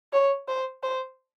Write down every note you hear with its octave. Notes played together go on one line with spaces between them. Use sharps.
C#5
C5
C5